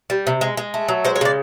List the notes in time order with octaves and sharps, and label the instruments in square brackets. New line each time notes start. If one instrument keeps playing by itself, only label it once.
[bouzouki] G3
C3
G#3
G#3
A3
F#3
G#3 C5
C#5
C#3 D5